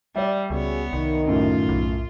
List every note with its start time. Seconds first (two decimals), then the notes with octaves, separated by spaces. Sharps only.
0.16 G3 D5 E5
0.50 C#2 B3 C#4 F#4 G#4 C#5
0.93 C2 D#3
1.28 F#2 A2 F4
1.69 B1